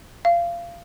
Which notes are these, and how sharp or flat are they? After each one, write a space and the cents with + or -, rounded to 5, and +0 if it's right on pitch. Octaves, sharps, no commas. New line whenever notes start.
F5 -25